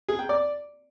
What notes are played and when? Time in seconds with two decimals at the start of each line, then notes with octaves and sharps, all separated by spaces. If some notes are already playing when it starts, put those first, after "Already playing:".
0.08 G#4
0.19 G5
0.29 D5